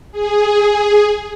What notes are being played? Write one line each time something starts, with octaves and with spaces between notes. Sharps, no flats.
G#4